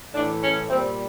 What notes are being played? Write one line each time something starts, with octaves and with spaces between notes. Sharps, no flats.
A2 E3 A3 D4
C#4
A#2 G3 C4